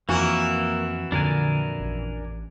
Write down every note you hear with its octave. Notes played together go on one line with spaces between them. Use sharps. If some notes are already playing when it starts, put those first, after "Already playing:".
F2 E3 F3 A#3 F#4 A#4
F2 A#2 D3 D4 A#4 G#5
A1